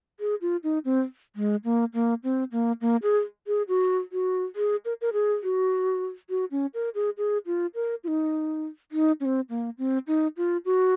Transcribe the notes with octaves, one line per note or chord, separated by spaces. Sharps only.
G#4
F4
D#4
C4
G#3
A#3
A#3
C4
A#3
A#3
G#4
G#4
F#4
F#4
G#4
A#4
A#4
G#4
F#4
F#4
C#4
A#4
G#4
G#4
F4
A#4
F4
D#4
D#4
C#4
C4
A#3
C4
D#4
F4
F#4